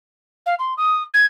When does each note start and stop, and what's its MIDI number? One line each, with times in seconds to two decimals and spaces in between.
0.46 0.55 77
0.59 0.74 84
0.77 1.03 87
1.14 1.26 92